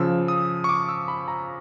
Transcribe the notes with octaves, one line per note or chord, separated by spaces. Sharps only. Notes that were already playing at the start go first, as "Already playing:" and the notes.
Already playing: C#3 F3 E6
D#6
C#6
D6
E6
B5
A#5